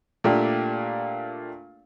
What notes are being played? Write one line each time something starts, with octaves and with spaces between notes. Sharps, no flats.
A#2 A3 A#3 D4 G4